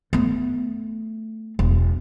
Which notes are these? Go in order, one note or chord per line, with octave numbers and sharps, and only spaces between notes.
A3 B3
E1